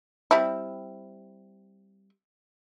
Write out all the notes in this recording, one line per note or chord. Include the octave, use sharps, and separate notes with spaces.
G3 C4 E4